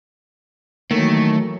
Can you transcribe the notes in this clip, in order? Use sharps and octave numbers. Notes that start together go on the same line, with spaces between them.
D#3 E3 F#3 A3 A#3